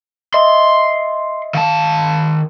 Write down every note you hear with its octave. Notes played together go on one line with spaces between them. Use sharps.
D#5 E5 C6
D#3 F5 A5